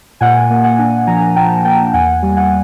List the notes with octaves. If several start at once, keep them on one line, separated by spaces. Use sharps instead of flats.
A#2 F#5 G#5
A#3
F#5 G#5
D4
F3 G#5 A#5
A#2 G5 A5
A#3 G5 A5
E2 F#5 G#5
G3
F#5 G#5